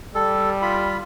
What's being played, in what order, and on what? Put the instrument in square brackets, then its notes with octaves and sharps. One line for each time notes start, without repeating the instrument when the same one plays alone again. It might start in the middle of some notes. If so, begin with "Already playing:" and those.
[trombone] G3 [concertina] A4
[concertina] F4 B5